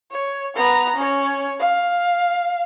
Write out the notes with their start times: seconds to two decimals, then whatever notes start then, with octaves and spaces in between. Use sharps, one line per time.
0.11 C#5
0.55 B3 A#5
0.96 C#4 C#5
1.59 F5